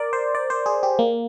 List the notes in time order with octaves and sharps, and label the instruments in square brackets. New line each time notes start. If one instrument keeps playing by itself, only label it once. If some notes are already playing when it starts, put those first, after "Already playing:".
Already playing: [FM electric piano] A#4 D5
C5
D5
C5
G#4
G4
A#3